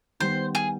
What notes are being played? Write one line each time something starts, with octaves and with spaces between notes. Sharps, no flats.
D#3 G3 B3 C5
G#4